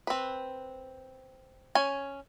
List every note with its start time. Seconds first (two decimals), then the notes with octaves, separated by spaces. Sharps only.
0.07 C4 B4
1.75 C#4 G#5